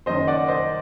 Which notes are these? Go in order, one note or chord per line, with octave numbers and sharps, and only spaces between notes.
F#1 F#2 D#3 C5 D#5
D5 F#5
C5 D#5